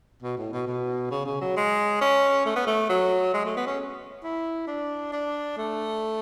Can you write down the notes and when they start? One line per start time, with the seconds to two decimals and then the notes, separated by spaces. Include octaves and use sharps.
0.23 B2
0.37 A2
0.53 B2
0.67 B2
1.11 C#3
1.26 C#3
1.41 F#3
1.57 G#3
2.01 C#4
2.46 A3
2.56 B3
2.67 A3
2.89 F#3
3.34 G#3
3.45 A3
3.57 B3
3.67 C#4
4.24 E4
4.67 D4
5.13 D4
5.57 A3